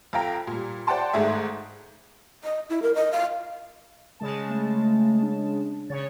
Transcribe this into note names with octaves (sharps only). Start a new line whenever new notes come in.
F2 A4 F5 G5 A#5
A#2 G3
C5 D5 F#5 G5 A5 C6
G#1 G#2 A3 G#4 E5
D#5
E4
A#4
D#5
F5
C#3 G#3 A5
A3
D4
C#3 C#5 A6